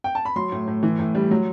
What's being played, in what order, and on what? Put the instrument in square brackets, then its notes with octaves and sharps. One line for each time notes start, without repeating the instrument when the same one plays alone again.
[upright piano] G5
A5
B5
F#3 C6
A2
A2
E3
A2
G3
F#3